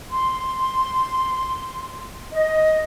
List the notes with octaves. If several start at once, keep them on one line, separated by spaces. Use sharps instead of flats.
C6
D#5